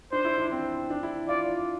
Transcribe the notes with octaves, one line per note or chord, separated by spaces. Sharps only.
D4 C5
E4
D4
C4
D4
E4
F4 D5